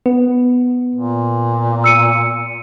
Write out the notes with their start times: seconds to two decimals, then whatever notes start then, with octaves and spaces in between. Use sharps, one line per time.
0.06 B3
0.95 A#2
1.84 E6 C#7 D#7